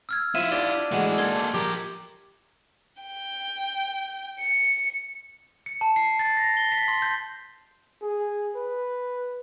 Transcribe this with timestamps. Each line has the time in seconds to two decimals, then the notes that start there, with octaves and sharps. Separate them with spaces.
0.09 E6 F6 G#6
0.35 F3 E4 F4 E5 D#7
0.52 D4 G4 D5
0.92 E3 G#3 A3 F#4
1.18 A#3 A4 C6 G#6 G7
1.54 F3 G4 A#4
3.02 G5
4.40 C#7
5.66 C#7
5.81 A5
5.96 C7
6.19 A6
6.37 A#6
6.57 G7
6.72 B6
6.88 C6
7.02 G6
8.02 G#4
8.56 B4